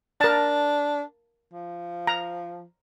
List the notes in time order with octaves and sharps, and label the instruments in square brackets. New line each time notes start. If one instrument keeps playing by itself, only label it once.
[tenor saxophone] D4 [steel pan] A#4 A5
[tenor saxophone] F3
[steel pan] A#5